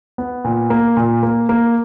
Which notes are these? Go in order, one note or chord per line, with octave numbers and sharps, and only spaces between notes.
B3
A#2
A#3
A#2
A#3
A#3